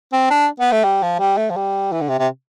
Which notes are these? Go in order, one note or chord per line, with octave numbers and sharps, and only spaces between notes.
C4
D4
B3
A3
G3
F3
G3
A3
F3
G3
E3
D3
C3
C3